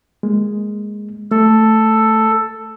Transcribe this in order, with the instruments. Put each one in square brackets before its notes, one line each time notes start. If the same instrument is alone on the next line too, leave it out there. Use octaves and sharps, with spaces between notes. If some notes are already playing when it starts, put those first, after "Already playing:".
[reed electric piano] G#3 A#3
[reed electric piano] A3 [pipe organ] A4